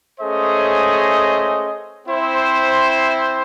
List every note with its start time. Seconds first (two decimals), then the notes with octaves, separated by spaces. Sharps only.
0.19 A3 C#4 G#4 C5 D#5
2.06 C4 E4 C5 E5